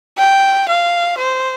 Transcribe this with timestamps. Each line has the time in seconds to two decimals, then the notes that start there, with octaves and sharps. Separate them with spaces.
0.18 G5
0.68 F5
1.18 C5